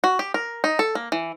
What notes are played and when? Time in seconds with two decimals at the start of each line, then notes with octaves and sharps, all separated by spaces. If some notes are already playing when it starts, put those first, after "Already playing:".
0.04 F#4
0.19 G4
0.34 A#4
0.64 D#4
0.79 A4
0.95 A#3
1.12 E3